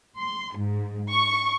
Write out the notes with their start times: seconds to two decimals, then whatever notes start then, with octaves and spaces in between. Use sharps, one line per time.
0.18 C6
0.55 G#2
1.11 C#6